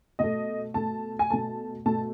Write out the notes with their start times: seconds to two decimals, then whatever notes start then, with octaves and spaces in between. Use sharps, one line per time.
0.19 B2 A3 D#5
0.74 B2 A3 A5
1.19 G#5
1.30 B2 A3 A5
1.86 B2 A3 A5